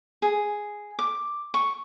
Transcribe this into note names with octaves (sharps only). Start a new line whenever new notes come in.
G#4
D6
C#6